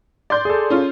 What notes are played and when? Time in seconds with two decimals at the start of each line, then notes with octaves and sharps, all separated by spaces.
0.30 D5 C6 G6
0.45 G#4 A4
0.70 C#4 F4